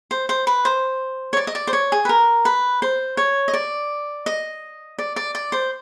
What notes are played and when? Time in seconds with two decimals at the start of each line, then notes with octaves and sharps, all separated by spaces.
0.11 C5
0.29 C5
0.47 B4
0.65 C5
1.33 C#5
1.37 D5
1.47 D#5
1.55 D5
1.67 C5
1.73 C#5
1.92 G#4
2.05 B4
2.09 A#4
2.45 B4
2.82 C5
3.17 C#5
3.48 D#5
3.54 D5
4.26 D#5
4.99 D5
5.16 D5
5.35 D5
5.52 C5